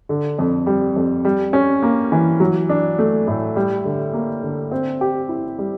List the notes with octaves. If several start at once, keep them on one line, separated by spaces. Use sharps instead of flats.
D3
F2
G3
F2
G3
C#4
A#3
E3
F#3
D4
A3
A2
G3
D3
A#3
D3
C4
G4
E4
G3